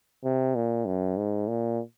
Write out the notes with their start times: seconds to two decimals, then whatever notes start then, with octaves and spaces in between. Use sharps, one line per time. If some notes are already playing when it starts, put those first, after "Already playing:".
0.24 C3
0.55 A#2
0.86 F#2
1.17 G#2
1.48 A#2